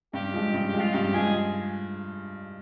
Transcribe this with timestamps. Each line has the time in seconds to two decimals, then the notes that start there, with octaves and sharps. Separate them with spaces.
0.14 G2 G4
0.34 F3 G#3
0.54 G2
0.67 G4
0.74 F3 G#3
0.80 F4
0.94 G2 G4
1.14 F3 G#3 G#4